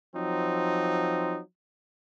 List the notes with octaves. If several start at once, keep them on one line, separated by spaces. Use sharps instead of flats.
F3 F#3 C4 D#4